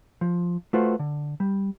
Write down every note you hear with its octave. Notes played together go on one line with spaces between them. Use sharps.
F3
A3 F4 F#4 B4 C5
D3
G3